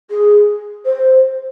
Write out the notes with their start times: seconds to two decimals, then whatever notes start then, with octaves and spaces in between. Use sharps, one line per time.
0.10 G#4
0.86 C5